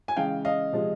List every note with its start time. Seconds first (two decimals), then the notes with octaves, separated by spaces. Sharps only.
0.08 G#5
0.17 C#3 E3 G#3 F5 G5
0.45 D#5 F5
0.73 C3 F3 G#3